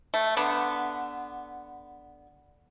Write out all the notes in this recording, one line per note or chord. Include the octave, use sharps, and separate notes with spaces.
A3
D3 B3